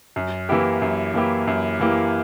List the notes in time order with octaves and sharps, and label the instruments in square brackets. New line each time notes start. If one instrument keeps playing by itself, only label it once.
[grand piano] F#2
E3 A#3 E4 G4
F#2
E3 A#3 E4 G4
F#2
E3 A#3 E4 G4